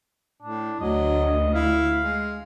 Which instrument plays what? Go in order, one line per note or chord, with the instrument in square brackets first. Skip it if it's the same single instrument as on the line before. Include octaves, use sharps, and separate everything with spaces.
[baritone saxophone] A2 [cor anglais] D4
[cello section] D2 [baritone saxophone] F#3 [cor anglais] D#5
[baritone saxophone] E4 [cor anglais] F5
[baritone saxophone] G#3